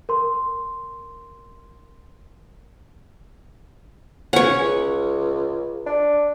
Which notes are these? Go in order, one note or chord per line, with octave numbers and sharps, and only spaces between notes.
A#4 C6
C#4 C#5 F#5
C#2
D4